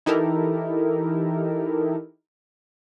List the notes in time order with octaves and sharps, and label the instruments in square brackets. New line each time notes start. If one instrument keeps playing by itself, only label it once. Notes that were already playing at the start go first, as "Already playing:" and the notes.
[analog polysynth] E3 D#4 E4 G4 A4 A#4